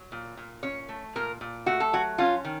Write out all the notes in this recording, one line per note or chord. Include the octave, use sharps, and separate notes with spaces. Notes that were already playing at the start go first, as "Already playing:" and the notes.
Already playing: F#3
A#2
A#2
C#4 C#5
A3
A#2 A#4
A#2
A3 F#4
A4
F#3 F#4
C#4 F4
D#3